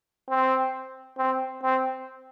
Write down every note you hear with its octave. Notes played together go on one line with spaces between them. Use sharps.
C4
C4
C4